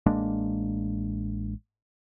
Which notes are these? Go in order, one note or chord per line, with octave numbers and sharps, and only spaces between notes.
A1 G#3 A#3 D4